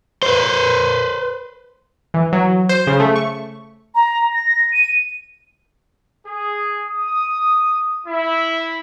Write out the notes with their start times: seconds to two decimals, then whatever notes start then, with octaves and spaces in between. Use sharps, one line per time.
0.23 B4 C5
2.14 E3
2.33 F#3
2.69 C5
2.87 C#3
3.00 A3
3.16 C#6
3.95 A#5
4.34 A#6
4.73 D#7
6.26 G#4
6.87 D#6
8.06 E4